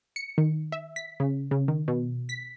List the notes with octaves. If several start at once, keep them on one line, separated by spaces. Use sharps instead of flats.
C#7
D#3
E5
B6
C#3
C#3
D#3
B2
B6